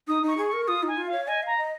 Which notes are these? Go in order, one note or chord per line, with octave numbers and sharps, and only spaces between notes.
D#4 D#6
D#4 C#6
G#4
C#6
A#4
F4 D#6
D#4 G#5
F4
C#5 F5
D#5 G#5
F5 A#5
D#5